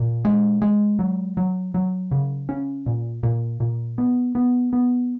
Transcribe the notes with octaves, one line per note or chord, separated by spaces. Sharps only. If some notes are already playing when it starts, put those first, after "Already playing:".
Already playing: A#2
G#3
G#3
F#3
F#3
F#3
C#3
C#4
A#2
A#2
A#2
B3
B3
B3